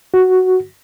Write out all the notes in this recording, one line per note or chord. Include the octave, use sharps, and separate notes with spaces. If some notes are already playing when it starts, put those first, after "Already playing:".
F#4